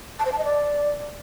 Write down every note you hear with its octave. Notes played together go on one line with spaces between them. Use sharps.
A5
C5
A5
D#5
D5